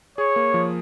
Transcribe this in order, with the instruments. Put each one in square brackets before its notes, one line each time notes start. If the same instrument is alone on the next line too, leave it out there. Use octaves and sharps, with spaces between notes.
[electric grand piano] G#4 [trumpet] C#5
[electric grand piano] A#3
F3